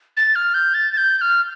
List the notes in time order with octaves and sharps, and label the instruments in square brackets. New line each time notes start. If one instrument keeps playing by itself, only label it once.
[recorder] A6
F6
G6
A6
A6
G6
G6
F6